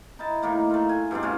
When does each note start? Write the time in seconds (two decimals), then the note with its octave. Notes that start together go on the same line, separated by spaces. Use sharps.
0.19 D#4 E4 A5
0.42 A2 D#3 A#3
0.70 A3 F4
0.89 G#5
1.11 G2 B2 C4 D4
1.23 A2 C#4 F4